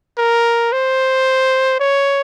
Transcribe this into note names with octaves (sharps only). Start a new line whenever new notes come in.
A#4
C5
C#5